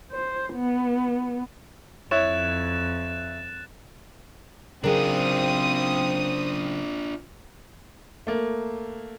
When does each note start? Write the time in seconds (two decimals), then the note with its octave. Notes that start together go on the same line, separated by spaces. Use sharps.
0.12 C5
0.54 B3
2.11 F2 E4 C#5 F#6 A6 E7
4.84 C#3 F#3 C4 D4 F4 G#4 A#4 D#6
8.27 A3 A#3